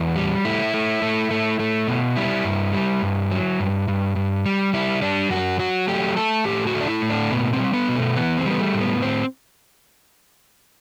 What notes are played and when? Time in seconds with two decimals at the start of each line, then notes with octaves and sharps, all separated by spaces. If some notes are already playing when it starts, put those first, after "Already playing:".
Already playing: E2 F#4
0.16 G3
0.45 A3 E4
0.74 A3
1.02 A3
1.31 A3
1.59 A3
1.88 B2
2.16 G3 E4
2.44 G2
2.74 G3
3.02 G2
3.31 F#3
3.60 G2
3.88 G2
4.16 G2
4.46 G3
4.73 G3 E4
5.02 G3 D4
5.31 F#2 F#4
5.59 F#3 F#4
5.88 A3 G4
6.16 A3 A4
6.45 A2 G4
6.67 F#4
6.74 A3
6.81 D4
6.88 E4
7.02 A2
7.10 D4
7.31 B2 B3
7.53 C4
7.59 G3
7.74 B3
7.89 B2
7.95 A3
8.16 E3 B3
8.38 C4
8.46 G3 B3
8.59 A3
8.74 A2
8.81 B3
9.02 C4